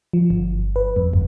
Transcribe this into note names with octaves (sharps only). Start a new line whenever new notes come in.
F3
G1
B4
F2
G1